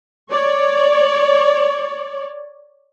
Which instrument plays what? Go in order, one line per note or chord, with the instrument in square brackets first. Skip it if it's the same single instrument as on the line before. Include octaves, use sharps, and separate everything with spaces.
[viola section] C#5 D5